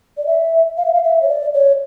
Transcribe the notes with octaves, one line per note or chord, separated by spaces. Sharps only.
D5
E5
F5
E5
F5
E5
C#5
D5
C#5